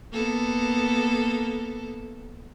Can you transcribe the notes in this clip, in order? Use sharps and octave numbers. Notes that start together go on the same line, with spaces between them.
A#3 B3 A4